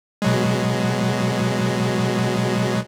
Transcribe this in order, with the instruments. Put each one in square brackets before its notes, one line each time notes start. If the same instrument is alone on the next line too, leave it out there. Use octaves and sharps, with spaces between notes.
[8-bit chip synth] B2 F#3 G#3